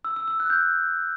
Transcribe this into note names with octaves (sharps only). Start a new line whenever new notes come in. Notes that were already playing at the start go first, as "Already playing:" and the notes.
E6
E6
E6
F#6
G6